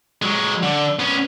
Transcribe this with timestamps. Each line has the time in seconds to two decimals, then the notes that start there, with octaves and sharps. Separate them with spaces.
0.22 F#3 G#3
0.63 D3
0.99 B3 C#4